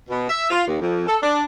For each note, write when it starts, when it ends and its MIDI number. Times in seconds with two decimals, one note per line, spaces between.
0.10 0.28 47
0.29 0.48 76
0.50 0.66 65
0.67 0.77 39
0.80 1.04 41
1.07 1.17 69
1.23 1.43 62